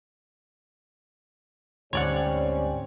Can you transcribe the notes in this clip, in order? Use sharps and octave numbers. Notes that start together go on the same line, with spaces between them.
D2 G#2 G3 C4 C#4 C#5 D5 F#5